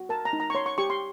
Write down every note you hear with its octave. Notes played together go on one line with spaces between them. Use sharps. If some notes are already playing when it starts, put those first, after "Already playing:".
Already playing: F#4
A#4 A5
A#5
D#4
A#5
C#6
C#5 C6
C#6
G4 C#6
C6